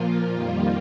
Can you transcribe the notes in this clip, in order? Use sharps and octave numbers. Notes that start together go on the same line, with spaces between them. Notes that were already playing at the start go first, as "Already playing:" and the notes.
Already playing: A#2 F3 A#3 F4
F2 D#3 G3 A#3